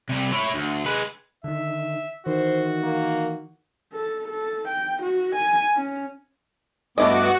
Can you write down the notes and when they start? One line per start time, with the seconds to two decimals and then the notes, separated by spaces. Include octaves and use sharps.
0.09 C3 G3
0.32 E4 C#5
0.54 D2
0.86 G#3 B4
1.44 D3 D#3 E5
2.27 D#3 E3 F#4 C5
2.83 A#3
3.93 A4
4.28 A4
4.69 G5
5.02 F#4
5.35 G#5
5.76 C#4
6.98 G2 A3 B3 E4 F#4 D#5 D6